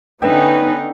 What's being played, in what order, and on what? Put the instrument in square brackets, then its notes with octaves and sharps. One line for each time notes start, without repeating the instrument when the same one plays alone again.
[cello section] D3 D#4 [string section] B3 C#4 [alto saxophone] B4 [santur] E5 G5